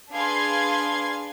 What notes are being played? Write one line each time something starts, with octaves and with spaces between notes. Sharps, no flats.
D4 G#4 B4 F5 C6 G#6